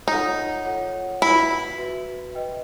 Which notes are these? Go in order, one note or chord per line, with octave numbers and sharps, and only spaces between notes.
D#4 F4 A4 C#5 F#5
F4 A4 C#5 F#5
E4 F#4 B4 E5
F#4 B4 E5
B4 D#5 G5